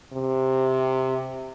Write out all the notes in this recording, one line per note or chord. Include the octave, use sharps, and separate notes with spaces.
C3